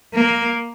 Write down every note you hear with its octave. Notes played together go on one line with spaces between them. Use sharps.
A#3